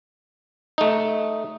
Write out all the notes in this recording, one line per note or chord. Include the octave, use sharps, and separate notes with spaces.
A3 D#4